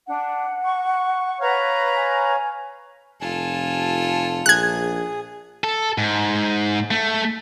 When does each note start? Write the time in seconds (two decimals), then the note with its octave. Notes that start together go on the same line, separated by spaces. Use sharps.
0.07 D4 F#5
0.63 C#6
1.40 B4 C#5 F5 A#5
1.96 G#5
3.21 F1 F4 A4 G#5 A5
4.46 A#1 G#4 F#6 G#6
5.64 A4
5.98 G#2
6.91 A3